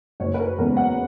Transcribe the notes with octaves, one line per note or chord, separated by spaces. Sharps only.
F#1 C#5
B4
A#4
E2 C#3 G#3 A#4
F#5